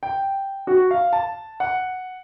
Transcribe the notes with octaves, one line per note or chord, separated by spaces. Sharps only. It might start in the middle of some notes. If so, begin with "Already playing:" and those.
G5
F#4
F5
A5
F#5